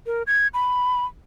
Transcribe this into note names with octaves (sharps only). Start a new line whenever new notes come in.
A#4
G#6
B5